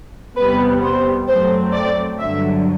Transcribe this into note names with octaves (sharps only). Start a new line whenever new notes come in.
E2 C3 G3 B3 B4
C5
F#2 F#3 A3 C4 C5
D5
G2 D3 F#3 E5